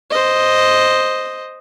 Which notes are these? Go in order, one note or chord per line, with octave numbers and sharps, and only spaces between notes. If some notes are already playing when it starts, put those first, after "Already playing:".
C5 D#5